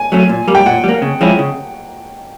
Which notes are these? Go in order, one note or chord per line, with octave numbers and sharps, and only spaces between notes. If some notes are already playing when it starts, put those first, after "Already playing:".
Already playing: G#5
F#3 A3 C#4
A#2
G3 A#3
G5
A#2 F#5
G3
A#3
C#3
F3 G#3 C#4 E4
C#3